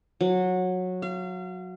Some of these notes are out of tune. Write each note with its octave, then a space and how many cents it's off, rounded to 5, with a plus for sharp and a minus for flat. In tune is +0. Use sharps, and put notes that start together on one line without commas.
F#3 -15
F5 -35